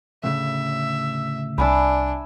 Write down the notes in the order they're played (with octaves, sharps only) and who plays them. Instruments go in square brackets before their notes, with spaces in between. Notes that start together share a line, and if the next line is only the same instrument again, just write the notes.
[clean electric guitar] D2 A2 C#3 [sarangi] E5
[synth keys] C2 [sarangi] D4 [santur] E5 G#5 B5